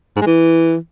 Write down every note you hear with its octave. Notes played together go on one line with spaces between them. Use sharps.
G#2
G#3
E3